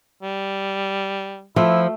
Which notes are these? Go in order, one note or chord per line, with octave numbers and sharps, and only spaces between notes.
G3
F3 A3 E4